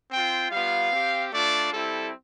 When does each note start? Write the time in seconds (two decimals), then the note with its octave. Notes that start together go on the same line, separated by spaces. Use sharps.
0.11 C4 F4 G5
0.52 G3 B3 F4 F5
0.92 C4 G4
1.32 A3 D4 F4 D5
1.72 G3 C4 E4 A4